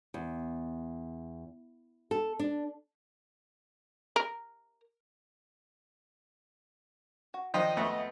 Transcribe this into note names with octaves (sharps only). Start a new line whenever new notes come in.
E2
A4
D4
A#4
F#4
D#3 F3 D4 F4 D#5 G5
F2 G#3 A3 B3 F#4 E5